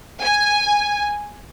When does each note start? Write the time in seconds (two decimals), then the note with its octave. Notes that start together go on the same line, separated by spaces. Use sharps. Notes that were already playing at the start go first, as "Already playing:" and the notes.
0.23 G#5